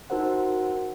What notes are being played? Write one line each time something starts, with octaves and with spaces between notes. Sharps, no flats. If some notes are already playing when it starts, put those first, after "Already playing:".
D#4 F#4 A#4 C5 F#5